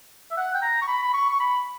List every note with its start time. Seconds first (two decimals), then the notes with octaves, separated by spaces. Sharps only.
0.31 E5
0.37 F#5
0.54 G5
0.62 A#5
0.82 C#6
0.88 B5
1.03 B5
1.14 C#6
1.30 C#6
1.40 B5